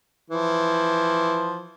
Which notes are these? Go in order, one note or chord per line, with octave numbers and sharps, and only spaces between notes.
E3 F3